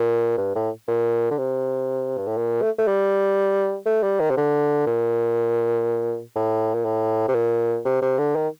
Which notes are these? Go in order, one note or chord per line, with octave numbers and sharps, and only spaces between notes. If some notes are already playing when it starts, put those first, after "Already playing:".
Already playing: A#2
G2
A2
A#2
D3
C3
G2
A2
A#2
A3
A3
G3
A3
G3
D#3
C3
D3
A#2
A2
A#2
A2
C3
A#2
C3
C3
D3
D#3